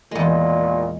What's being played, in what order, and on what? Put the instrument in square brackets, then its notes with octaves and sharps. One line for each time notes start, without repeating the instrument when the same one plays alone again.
[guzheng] E2 G#3 [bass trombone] A#2